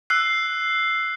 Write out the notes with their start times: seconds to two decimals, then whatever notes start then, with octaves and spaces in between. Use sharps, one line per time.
0.10 E6 F#6 C7